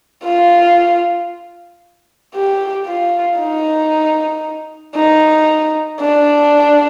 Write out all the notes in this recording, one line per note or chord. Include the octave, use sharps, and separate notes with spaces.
F4
G4
F4
D#4
D#4
D4